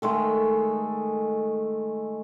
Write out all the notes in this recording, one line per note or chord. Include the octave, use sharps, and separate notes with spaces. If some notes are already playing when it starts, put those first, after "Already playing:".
D#3 G#3 A3 A4